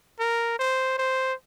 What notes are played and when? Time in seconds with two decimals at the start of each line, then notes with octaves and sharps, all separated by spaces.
0.20 A#4
0.59 C5
0.98 C5